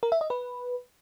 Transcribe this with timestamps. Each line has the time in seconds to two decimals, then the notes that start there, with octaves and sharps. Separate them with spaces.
0.03 A#4
0.12 E5
0.21 D#5
0.30 B4